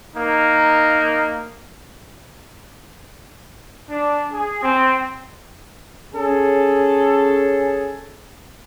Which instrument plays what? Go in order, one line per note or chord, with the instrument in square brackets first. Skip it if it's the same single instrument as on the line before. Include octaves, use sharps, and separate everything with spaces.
[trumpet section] A#3 D#4
D4
G#4
C4
[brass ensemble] C#4 G#4 A4